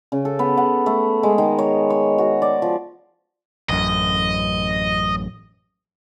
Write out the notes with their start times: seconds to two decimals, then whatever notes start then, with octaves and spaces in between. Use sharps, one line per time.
0.12 C#3
0.25 A4
0.39 B3
0.57 F#5
0.86 A3
1.23 G#3
1.38 D#3
1.58 C#5
1.90 C#5
2.18 F#4
2.42 D5
2.62 F3
3.69 A1 F#2 D#5